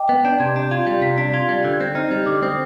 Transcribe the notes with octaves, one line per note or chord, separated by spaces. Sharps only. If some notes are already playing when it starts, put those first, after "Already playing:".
Already playing: D#5 G5 D6
B3
D4 G6
C3 G#6
D4
G6
F4 G#6
G3
C3 B6
D4 B6
F4 G#6
G3 G#6
D3 G6
G#6
C4 G6
D#4 F6
G3
D3 D6
C4 D#6